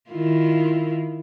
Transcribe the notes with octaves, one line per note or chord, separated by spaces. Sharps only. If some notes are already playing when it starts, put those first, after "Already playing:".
D#3 E4 F4